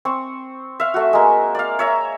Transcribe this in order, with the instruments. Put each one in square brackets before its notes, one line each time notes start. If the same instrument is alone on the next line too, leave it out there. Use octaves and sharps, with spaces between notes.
[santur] C4 C#6
E5 F5
A3 F#4
G#3 A#3
D5 F5
C#5 E5 A#5